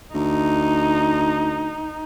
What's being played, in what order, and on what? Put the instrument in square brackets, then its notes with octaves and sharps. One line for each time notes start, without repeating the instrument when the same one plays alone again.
[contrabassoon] D2 [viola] D#4